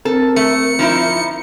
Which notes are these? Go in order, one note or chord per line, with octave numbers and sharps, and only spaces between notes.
C4 A4 A#4
A3 C#7
F3 D#4 E4